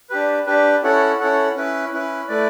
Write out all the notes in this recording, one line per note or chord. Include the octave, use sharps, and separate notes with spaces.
D4 G4 B4
D4 G4 B4
C#4 E4 A4 C#5 F#5
C#4 E4 A4 C#5 F#5
C#4 E4 B4
C#4 E4 B4
A3 E4 B4 D5